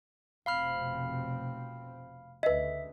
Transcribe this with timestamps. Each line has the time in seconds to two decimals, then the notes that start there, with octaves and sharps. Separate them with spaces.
0.46 F1 B2 C4 F5 B5 F6
2.43 D2 C#3 B4 D#5 E5